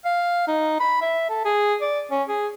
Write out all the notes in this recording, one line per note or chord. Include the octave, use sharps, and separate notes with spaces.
F5
D#4
B5
E5
A4
G#4
D5
C#4
G#4